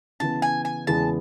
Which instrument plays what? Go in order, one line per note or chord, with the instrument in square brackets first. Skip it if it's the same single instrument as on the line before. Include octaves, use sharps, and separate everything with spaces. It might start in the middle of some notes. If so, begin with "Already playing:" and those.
[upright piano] C#3 E3 B3 [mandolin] A5
[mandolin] G#5
G#5
[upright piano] E2 C#3 E3 G#3 B3 [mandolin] A5